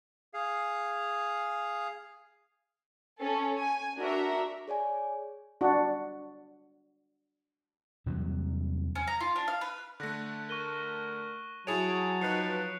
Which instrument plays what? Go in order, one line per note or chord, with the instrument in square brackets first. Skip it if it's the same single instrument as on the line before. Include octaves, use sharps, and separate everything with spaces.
[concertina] G#4 F5
[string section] C#4 A4
G#5
D4 F#4 A#4 E5
[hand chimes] G#4 C#5 D5 G#5
[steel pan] D4 F#4
[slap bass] E2 C3 F#3 G3
[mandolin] C#4
A#5
F4
D4
F5
B4
[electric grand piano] D3 A3 [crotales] F#6 A#6
[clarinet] A#4 [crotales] C#6 D#7 G7
[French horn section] F#3 [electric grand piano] E4 G#4 C#5 [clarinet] A5 [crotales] D7 F7
[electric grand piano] F3 D#4 B4 [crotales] F#6 C7 C#7